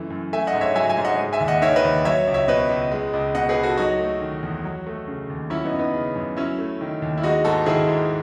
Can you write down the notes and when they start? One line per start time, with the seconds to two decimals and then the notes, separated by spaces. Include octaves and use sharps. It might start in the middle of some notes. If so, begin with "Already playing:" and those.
Already playing: F#2 E3 A3
0.10 F#2
0.33 A3 E5 G#5
0.47 D#5 F#5
0.53 G#2
0.61 C#5 E5
0.75 F#3 E5 G#5
0.90 E5 G#5
0.97 G#2
1.05 D#5 F#5
1.18 G#3
1.33 E5 G#5
1.40 D#2
1.48 D#5 F#5
1.62 D#3 C#5 E5
1.76 B4 D#5
1.84 D#2
2.05 F#3 C#5 E5
2.27 C#2
2.34 C#5 E5
2.48 B2 B4 D#5
2.69 C#2
2.91 G#3
3.13 C#2
3.35 B2 D#5 F#5
3.49 G#4 B4
3.56 C#2
3.63 F#4 A4
3.77 F#3 D#4 F#4
3.99 A3
4.22 D#3
4.43 E2
4.64 F#3
4.87 A3
5.07 C#3
5.30 D#2
5.50 F#3 C#4 E4
5.65 B3 D#4
5.72 F#2
5.79 B3 D#4
5.94 C#3
6.15 F#2
6.37 F#3 C#4 E4
6.59 A3
6.81 D#3
7.02 D#2
7.17 E4
7.23 G#3 D#4 F#4
7.45 G#2 F#4 A4
7.66 D#3 E4 G#4
7.88 G#2